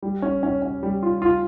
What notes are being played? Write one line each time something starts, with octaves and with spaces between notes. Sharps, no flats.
G3
C#4
C#4
C#4
G3
F4
F4